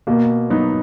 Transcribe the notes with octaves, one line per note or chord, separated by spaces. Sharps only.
B2 A#3
F#3 B3 D#4